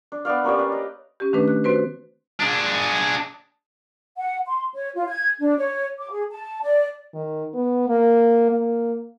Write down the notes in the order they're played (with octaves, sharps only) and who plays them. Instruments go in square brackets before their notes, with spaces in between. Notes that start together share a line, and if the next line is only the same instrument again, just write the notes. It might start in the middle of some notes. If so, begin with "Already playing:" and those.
[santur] D4
B3 D4 D5 F5
A#3 C#4 G4 D5
D4 B4
D#5
[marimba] C#4 G4
D#3 A3 C#4 D4 B4
F#6
C4 F#4 B4 C5
[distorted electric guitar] D4 G#4
[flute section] F#5
C6
C#5
F4
G#6
D4
C#5
D6
G#4
A5
D5
[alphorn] D#3
B3
A#3
A#3